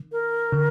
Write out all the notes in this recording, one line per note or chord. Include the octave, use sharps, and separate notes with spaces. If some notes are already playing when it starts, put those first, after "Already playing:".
Already playing: D#3
A#4
D3